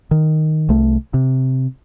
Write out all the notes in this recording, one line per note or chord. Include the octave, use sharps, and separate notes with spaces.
D#3
C2 A3
C3